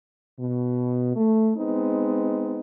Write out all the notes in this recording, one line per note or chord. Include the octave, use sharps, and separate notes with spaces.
B2
A3
G#3 B3 C4 D#4